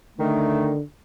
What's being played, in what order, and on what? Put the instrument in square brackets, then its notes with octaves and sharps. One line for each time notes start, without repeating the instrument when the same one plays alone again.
[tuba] D3 [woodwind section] D#3 A3